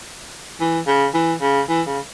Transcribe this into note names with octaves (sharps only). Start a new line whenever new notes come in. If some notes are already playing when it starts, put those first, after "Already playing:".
E3
C#3
E3
C#3
E3
C#3